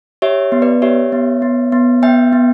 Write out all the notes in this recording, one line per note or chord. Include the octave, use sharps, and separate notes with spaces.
G4 C#5 E5
B3
B4 D5
G4 C#5 E5
B3
B3
B3
B3 E5 G5
B3